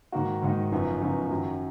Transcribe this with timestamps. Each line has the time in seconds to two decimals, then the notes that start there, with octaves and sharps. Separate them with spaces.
0.12 G#2 D#3 A#3 D#4 F#4
0.42 G#2 D#3 A#3 D#4 F#4
0.72 F#1 F#2 F3 B3 D#4
1.01 F#1 F#2 F3 B3 D#4
1.31 F#2 D#3 F#3